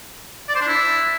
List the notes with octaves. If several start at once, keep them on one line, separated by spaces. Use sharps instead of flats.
D5
C5
D4
E4